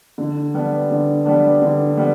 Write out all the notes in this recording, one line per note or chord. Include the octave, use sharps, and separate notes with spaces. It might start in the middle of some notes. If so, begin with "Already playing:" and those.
D3
G3 B3 D4
D3
G3 B3 D4
D3
G3 B3